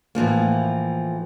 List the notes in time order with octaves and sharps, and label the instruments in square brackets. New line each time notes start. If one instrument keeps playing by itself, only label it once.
[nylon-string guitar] A2 E3 F3 A#3